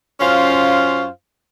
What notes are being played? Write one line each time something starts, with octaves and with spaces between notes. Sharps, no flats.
F#2 C#4 F4 C5 F5